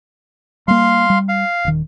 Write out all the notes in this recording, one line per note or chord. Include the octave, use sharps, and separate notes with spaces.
G3 A#3 F5 C6
G3
F5
D#1 D#3